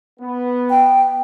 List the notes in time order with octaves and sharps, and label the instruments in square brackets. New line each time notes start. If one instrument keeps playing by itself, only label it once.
[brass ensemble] B3
[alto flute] G5